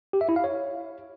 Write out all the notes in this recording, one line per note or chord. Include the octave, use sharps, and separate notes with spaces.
G4
E5
E4
F5
C#5